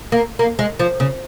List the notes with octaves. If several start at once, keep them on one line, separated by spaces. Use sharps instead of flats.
A#3
A#3
G#3
F3
C#3